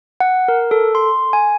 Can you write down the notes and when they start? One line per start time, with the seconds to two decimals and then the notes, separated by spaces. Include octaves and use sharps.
0.20 F#5
0.48 A#4
0.71 A4
0.95 C6
1.33 G#5